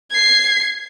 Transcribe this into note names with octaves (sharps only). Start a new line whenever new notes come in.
G#6 C7